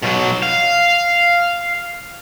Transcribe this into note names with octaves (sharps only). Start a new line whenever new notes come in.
B2 F#3
F5